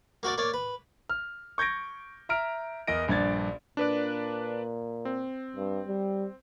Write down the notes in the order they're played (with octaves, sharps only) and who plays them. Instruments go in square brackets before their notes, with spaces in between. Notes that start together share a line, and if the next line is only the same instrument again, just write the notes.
[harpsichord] A#3 F#4 A#4 D5
A#3 C#5 D5
B4
[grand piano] F6
C#6 G6 G#6 A#6 D7
E5 A#5 F6 D7
E2 A#4 D#5 A#6 D7
A#1 G2 D5 G#6 A6
[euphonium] A#2 [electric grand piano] D4 B4 D5
[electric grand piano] C4
[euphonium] G2
G3